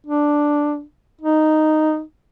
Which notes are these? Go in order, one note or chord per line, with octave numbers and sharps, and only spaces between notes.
D4
D#4